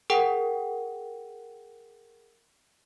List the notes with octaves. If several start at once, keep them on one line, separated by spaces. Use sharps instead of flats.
G#4 A#4 F#5 G5